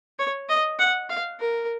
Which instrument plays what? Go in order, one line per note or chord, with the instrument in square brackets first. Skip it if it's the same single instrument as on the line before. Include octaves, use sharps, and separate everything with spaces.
[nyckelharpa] C#5
D#5
F#5
F5
A#4